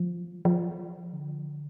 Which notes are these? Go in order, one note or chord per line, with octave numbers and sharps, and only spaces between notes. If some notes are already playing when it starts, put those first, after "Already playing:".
Already playing: F3
F3
D3